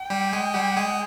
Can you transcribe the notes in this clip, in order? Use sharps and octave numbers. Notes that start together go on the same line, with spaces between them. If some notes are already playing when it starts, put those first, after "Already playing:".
Already playing: G5
G3 G4
G#3 G#4
G3 G4
G#3 G#4